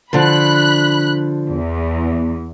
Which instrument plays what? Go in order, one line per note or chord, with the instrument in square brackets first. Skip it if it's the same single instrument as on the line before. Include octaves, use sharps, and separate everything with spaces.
[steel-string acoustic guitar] D3 F3 [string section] B5 F#6
[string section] E2